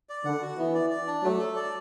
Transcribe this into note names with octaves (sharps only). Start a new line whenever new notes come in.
D5
D3 F#5
F#4
E3 B3
D5
D5
D4
F#3 A3
A4
D5